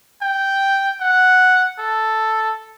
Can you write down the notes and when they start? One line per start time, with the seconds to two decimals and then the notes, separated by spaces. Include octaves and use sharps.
0.22 G5
1.01 F#5
1.79 A4